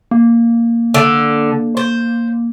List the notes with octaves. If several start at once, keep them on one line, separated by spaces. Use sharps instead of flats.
A#3
D3
C5